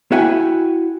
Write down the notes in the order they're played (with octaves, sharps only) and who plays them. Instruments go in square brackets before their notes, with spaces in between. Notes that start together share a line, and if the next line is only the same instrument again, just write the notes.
[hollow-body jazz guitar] E4 F#4 G5 G#5